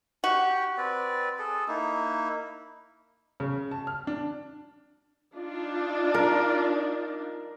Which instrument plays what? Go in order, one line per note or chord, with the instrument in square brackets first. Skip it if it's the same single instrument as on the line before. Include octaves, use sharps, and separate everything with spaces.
[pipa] F#4 [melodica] G4 G5
[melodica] C4 B4 D5
G#4 A4
A#3 D#4 E4
[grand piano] C#3
A5
F6
D4
[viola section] D4 D#4 F4
[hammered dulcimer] A#4